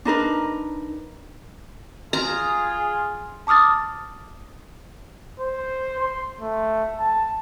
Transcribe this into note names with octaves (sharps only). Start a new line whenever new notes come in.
D4 D#4 A#4 B4
F4 G#4 A#5
A5 D6 D#6 F6 A6
C5
C6
A3
A5